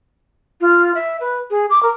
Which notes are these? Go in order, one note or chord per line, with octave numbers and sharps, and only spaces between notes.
F4
E5
B4
G#4
D6
A#4